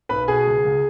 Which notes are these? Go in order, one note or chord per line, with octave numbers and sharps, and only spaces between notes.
B1 B4 B5
B2 G#4 G#5
C#2
C#2